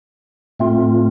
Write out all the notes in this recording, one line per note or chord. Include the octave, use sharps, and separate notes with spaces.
A2 A3 C4 F4